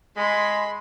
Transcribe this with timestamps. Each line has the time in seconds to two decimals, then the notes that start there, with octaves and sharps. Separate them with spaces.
0.17 G#3 B5 C6